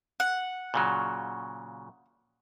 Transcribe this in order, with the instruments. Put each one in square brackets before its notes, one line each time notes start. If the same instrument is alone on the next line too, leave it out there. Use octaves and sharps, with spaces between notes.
[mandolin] F#5
[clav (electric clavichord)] A#2 C#3 F#3